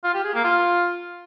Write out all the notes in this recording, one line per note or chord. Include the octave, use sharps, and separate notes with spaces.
F4
G4
G#4
A#3
F4